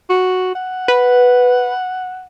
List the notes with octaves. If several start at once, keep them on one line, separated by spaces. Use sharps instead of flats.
F#4
F#5
B4